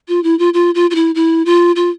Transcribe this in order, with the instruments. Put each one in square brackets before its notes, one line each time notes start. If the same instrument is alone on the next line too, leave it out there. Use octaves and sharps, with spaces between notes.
[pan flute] F4
E4
F4
F4
F4
F4
E4
E4
F4
F4